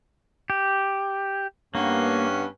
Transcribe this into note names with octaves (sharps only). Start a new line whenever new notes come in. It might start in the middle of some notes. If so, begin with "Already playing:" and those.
G4
G2 A#3 B3 C#4